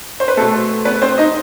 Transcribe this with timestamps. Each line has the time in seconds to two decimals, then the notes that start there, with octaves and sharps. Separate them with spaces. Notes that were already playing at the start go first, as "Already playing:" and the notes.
0.20 C5
0.28 B4
0.37 B2 A3 C4 A4
0.85 B3 B4
1.01 C4 C5
1.18 D#4 D#5